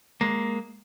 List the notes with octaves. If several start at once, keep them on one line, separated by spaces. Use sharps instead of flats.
G#3 A#3